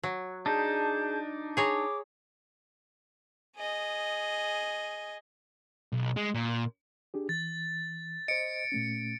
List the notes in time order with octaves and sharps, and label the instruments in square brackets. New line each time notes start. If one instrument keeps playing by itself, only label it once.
[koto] F#3
[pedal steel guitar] D4 D#4 [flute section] G#4 A5 G6
[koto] G#4 C#5 A#5 [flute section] D6
[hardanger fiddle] G#4 D#5
[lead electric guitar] B1
G#3
A#2
[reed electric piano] D4 G4 G#4
[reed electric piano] E3 [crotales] A6
[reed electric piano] C5 D#5 [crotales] C#7 D7
[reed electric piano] A#2 A3 C#4